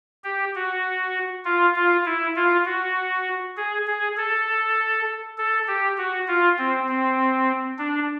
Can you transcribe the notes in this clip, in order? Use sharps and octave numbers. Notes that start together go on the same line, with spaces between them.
G4
F#4
F4
F4
E4
F4
F#4
G#4
G#4
A4
A4
G4
F#4
F4
C4
C4
D4